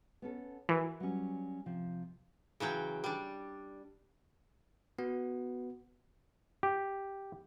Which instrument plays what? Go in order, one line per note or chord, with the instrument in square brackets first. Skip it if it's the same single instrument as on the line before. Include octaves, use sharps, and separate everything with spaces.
[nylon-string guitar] B3 C#4 A4
[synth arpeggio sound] E3 [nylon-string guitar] F#4 A#4 B4
[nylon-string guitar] F#3 G3 C#4
C3 F3
[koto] C#3 E3 F#3 G5
G3 D4
[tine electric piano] B3 [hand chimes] F#4
[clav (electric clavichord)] G4